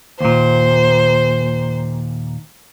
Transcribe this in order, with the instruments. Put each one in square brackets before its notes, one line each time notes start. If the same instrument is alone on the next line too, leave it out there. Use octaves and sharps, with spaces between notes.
[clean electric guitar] D#2 A#2 [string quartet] C5